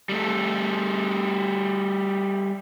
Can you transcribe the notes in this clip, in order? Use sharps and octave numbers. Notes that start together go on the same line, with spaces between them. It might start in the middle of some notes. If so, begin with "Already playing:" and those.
G3 A3